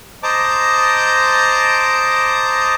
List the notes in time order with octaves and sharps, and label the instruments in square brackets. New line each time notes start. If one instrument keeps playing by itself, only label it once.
[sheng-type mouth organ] C5 D#5 A5 A#5 D6